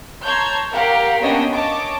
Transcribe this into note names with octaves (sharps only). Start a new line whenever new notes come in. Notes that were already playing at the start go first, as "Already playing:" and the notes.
C#5 A5 A#5 C6 G6 G#6
G4 A#4 F5 F#5
A#3 B3 C#4 D4 D#5 G5
C#5 D#5 A5 D6